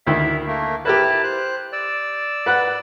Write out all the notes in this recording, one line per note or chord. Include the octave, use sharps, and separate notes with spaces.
D2 D#3 E4 E5
A3 A#3
E4 G4 A#4 B4 A5
C5 F#6
D5 E6
B4 F#5 F#6